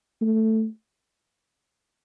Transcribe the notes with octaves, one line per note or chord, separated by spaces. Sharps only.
A3